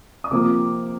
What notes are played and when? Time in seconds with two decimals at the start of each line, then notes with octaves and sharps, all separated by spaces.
0.24 D#6
0.31 C3 F3 A#3 D6